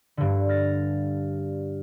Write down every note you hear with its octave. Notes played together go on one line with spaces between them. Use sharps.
G2 D3
F6 A6 A#6